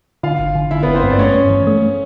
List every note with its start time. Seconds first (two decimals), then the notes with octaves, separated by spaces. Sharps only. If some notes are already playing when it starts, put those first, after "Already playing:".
0.23 D3 F4 F5
0.39 G#1
0.55 D3
0.71 D3 E4 E5
0.83 G#1 B3 B4
0.95 C4 C5
1.03 G2
1.10 D5
1.18 A3 C#4 C#5
1.35 G2
1.50 E3
1.67 A3